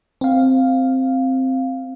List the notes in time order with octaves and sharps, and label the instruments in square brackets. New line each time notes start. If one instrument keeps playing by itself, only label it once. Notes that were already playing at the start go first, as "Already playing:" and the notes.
[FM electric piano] C4 F5